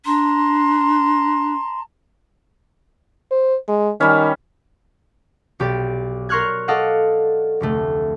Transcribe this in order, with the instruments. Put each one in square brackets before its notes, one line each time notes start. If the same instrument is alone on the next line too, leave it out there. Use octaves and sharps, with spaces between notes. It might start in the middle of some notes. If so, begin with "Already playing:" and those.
[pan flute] D4 [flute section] A5 A#5 C6
[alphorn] C5
G#3
[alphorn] D#3 [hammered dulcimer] G3 C#4
[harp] B1 G4 D5
A#4 C6 C#6 F6 F#6 G#6
A4 D5 D#5 F5 F#5
F1 D2 A3